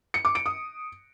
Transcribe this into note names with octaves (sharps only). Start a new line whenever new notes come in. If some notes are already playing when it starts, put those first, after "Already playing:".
C#7
D6
D7
D#6